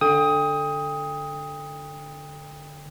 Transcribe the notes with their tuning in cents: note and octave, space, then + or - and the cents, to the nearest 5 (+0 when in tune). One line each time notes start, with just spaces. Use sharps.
D3 +0 G5 +30 D#6 +15